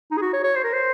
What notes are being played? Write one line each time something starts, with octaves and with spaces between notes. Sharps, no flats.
D#4
G#4
F#4
C#5
C#5
C5
A#4
C5